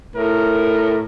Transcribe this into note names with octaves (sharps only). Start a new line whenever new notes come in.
A2 A#4